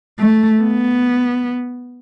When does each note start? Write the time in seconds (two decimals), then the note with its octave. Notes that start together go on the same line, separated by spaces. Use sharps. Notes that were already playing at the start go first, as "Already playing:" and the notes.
0.19 A3
0.61 B3